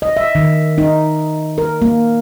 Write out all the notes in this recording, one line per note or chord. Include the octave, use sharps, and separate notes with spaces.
D#5
E5
D#3
D#4
A#4
A#3